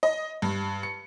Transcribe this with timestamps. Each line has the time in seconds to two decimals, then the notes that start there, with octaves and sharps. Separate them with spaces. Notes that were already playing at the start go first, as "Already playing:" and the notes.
0.03 D#5
0.42 G2
0.83 C#7